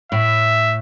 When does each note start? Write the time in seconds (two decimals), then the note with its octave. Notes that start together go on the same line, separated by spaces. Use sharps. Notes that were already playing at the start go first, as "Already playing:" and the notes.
0.12 A2 E5